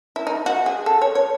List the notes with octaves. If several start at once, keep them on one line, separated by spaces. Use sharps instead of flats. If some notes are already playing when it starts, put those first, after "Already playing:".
E4
D#4
F#4
G#4
A4
C#5
C#5